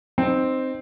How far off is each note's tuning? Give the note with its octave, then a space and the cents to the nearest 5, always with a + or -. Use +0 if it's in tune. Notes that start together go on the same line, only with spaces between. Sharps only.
C4 +0 D#4 -15